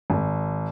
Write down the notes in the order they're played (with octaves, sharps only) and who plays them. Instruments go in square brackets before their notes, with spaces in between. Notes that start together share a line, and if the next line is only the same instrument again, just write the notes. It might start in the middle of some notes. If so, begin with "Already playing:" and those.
[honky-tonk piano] G#1